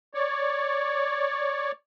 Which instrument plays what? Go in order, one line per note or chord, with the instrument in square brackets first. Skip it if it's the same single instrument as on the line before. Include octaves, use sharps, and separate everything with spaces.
[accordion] C#5 D5